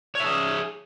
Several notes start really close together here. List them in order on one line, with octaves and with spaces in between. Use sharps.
C#5 E5 G#4